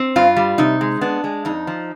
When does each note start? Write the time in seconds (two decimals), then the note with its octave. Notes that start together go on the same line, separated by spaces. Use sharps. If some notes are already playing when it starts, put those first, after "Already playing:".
Already playing: C4
0.16 G2 F4
0.36 G3
0.58 C3 D#4
0.81 G#3
1.01 B3 D4
1.24 G#3
1.45 F2 D#4
1.67 F3